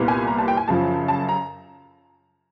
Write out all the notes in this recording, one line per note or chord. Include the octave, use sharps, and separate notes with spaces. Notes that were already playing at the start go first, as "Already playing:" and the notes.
Already playing: C2 A#2 G3 B3
G#5
A#5
A5
G5
G#5
F#2 C#3 F3 A5
A5
A#5